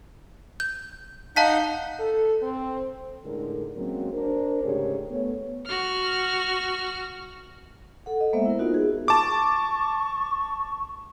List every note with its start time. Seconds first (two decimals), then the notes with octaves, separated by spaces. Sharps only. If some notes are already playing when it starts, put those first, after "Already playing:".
0.60 G6
1.36 D#4 F5 F#5 A5 G6 B6
2.00 A4
2.43 C4
3.25 A2 D3 G#3 D#4 A#4
3.76 F#3 G#3 A#3 C4 C#4 F#4
4.13 D4 A#4 C5
4.63 D2 G#2 C#3 G4 G#4 C#5
5.10 A3 B3 C#5
5.67 F#4 F6
8.06 A4 F#5
8.20 D#5
8.33 G#3 A#3 B3 C5 E5
8.46 E4 A#4
8.59 B3 D#4 F4 F#4
8.74 G#4
9.08 A5 C#6 D6